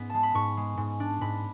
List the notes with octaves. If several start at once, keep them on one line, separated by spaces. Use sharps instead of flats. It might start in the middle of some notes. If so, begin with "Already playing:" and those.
Already playing: G#2 B3
G#3 A5
B5
G#2 C#6
G#3
G#2
D4
G#2 B5